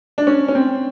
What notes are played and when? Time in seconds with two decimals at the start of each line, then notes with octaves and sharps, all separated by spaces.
0.18 D4
0.27 C#4
0.48 C#4
0.55 C4